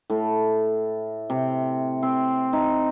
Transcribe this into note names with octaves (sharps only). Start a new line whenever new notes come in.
A2
C3
C4
D#4